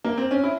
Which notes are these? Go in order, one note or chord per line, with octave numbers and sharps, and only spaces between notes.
A#3
C4
C#4
E4